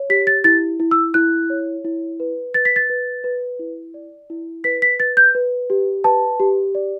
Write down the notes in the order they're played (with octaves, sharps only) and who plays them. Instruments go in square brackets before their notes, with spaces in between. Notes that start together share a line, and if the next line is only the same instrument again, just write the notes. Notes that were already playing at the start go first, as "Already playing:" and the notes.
Already playing: [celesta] C#5
G4 B6
A6
E4 A6
E4
E6
E4 F#6
C#5
E4
B4
B4 A6
B6
A6
B4
B4
E4
D5
E4
B4 B6
B6
B4 A6
G6
B4
G4
B4 A5
G4
D5